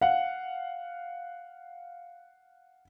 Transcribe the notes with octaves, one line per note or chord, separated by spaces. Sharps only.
F5 F#5